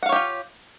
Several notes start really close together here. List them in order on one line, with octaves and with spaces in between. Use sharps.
F#5 F5 C#5 G4 F4